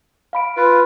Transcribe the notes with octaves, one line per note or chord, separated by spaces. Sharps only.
F5 B5 D7
F4 B4